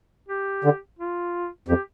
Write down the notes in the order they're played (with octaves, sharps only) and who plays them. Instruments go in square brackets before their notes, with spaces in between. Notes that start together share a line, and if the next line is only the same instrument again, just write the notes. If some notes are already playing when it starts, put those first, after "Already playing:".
[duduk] G4
[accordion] D3
[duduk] F4
[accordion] F2 [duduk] G4